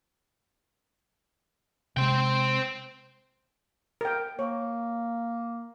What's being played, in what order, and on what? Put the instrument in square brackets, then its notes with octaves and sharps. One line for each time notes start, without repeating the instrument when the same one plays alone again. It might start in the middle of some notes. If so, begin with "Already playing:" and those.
[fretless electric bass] C3 G#3 [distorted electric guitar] C5 G5
[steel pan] A#4 G5
[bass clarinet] A#3 [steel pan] C#5